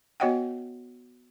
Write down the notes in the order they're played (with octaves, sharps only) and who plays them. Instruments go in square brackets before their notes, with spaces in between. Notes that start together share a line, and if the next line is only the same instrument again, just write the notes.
[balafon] B3 F#4 C#5 D#5 F#5 G5